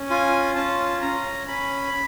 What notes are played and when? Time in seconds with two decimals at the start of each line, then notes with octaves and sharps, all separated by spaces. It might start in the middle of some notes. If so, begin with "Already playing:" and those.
Already playing: C#4
0.10 F4 G#5
0.55 C#4 A5
1.01 C#4 A#5
1.48 C#4 B5